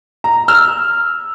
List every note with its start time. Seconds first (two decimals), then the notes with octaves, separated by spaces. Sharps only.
0.24 A#5
0.48 E6 F6